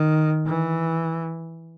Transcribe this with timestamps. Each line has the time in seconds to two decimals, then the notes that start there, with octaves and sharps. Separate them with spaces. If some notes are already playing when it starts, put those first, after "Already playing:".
Already playing: D#3
0.46 E3